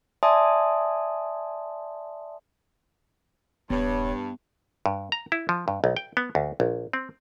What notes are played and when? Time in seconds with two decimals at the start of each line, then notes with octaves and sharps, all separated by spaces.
0.23 D5 E5 G#5 A5 C6 D#6
3.70 D#1 G2 B3 C#5
4.86 G2
5.12 A#5
5.32 E4
5.49 F3
5.68 G2
5.84 B1
5.97 G5
6.17 B3
6.35 D2
6.60 A#1
6.93 C4